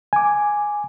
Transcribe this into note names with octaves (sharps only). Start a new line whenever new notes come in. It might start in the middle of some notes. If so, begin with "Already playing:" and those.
G#5 D6